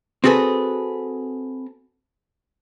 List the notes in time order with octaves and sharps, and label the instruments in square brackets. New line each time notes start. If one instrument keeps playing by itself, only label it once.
[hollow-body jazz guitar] C4 F#4 G#4 A4 B4